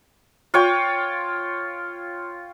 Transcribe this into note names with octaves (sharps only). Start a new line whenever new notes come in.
F4 C#5 G5